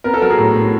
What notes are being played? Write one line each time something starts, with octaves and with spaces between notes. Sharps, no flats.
B3 A#4
A4
F#3 A#4
G#4
A2
A2